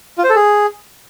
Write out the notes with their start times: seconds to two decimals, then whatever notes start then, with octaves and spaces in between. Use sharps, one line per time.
0.18 F4
0.24 C5
0.30 A4
0.35 G#4